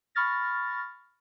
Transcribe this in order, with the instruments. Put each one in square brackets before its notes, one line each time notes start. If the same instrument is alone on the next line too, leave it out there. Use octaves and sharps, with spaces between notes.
[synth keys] B5 C#6 F6 A6 A#6